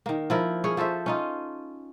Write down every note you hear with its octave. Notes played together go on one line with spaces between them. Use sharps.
D#3 A#3
F3 E4 A#4
C#4 G#4 C#5
F3 A4 C5 E5
C#4 D#4 F4